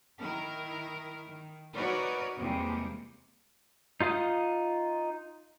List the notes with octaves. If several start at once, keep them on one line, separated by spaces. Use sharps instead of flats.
D#3 E4 A#4
D#3
D#4 F#4 A#4 B4 C#5 D5
E2 C3 G3 G#3 A#3
D#4 F4 F5 D#6